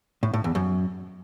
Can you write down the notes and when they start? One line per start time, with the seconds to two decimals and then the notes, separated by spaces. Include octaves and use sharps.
0.23 A2
0.34 A2
0.44 E2
0.55 F#2